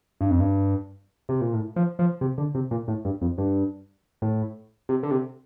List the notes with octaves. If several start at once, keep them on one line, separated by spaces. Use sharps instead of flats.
G2
F2
G2
C3
A#2
A2
F3
F3
C3
D3
C3
A#2
A2
G2
F2
G2
A2
C3
D3
C3